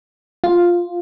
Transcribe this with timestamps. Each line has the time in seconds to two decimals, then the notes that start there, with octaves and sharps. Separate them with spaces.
0.44 F4